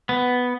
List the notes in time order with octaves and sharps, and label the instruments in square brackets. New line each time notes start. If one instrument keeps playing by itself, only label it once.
[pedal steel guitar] B3